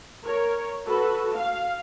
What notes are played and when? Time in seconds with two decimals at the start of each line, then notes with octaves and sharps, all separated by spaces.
0.24 A#4 C#5
0.86 F#4 A4 B4
1.33 F5